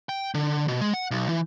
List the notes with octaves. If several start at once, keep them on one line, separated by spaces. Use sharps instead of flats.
G5
D3
B2
G#3
F#5
B1
E3